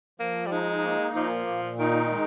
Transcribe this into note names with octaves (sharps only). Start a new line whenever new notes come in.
F3 A#3
G3
G#3 D#4
A#3
A#2 F3
A#2
D#3 D#4
G#3